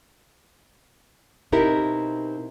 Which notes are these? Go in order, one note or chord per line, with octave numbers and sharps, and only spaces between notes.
B2 C4 D#4 E4 G4 A#4